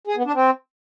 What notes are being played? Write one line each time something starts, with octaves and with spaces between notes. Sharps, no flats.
G#4
B3
D4
C4